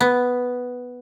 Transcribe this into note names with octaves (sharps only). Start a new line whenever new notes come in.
B3